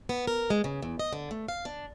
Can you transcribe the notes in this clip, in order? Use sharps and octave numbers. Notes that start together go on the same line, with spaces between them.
B3
A#4
G#3
C#3
E2
D#5
D3
A3
F5
D4